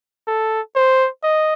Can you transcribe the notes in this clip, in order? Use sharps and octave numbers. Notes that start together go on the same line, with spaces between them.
A4
C5
D#5